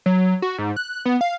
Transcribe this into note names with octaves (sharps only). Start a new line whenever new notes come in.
F#3
F#4
G#2
F#6
B3
F5